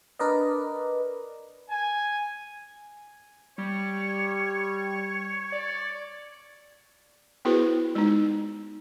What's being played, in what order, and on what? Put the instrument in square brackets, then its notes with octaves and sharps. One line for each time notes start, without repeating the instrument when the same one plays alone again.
[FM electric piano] D4 A#4 B4 D5 D#5
[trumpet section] G#5
[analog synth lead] G3 [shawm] C#5
[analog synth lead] D5
[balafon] B3 E4 F#4 G#4 B4 C5
G#3 D#4